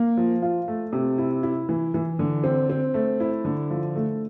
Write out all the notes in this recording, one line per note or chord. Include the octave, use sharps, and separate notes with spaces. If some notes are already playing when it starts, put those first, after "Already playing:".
Already playing: A#3
F3
F4
A3
C3
E4
E4
E3
E3
D3
C4
C4
A3
E4
D3
F3
A3